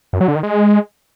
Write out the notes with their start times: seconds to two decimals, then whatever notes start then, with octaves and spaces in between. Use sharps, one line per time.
0.13 F#2
0.21 F#3
0.28 D3
0.36 D#3
0.43 G#3